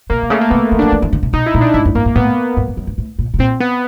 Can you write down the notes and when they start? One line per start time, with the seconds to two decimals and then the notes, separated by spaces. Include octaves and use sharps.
0.10 B2 A#3
0.23 C3
0.30 C#3 A3
0.41 A#3
0.50 C3 B3
0.72 E3
0.79 F3 D4
0.92 E3
1.02 E3
1.13 D3
1.23 C3
1.33 B2 D#4
1.46 E4
1.54 A#2
1.61 D4
1.74 G#2 E4
1.85 F#2
1.95 G2 A#3
2.05 G#2
2.16 A2 B3
2.57 G#2
2.68 G2
2.77 F#2
2.87 G2
2.98 A2
3.19 A#2
3.34 B2
3.39 A#2 C4
3.60 B3